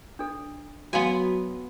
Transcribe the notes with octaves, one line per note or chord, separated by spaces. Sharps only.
D4 A4
F#3 B3 F#4 F5 G#5 C6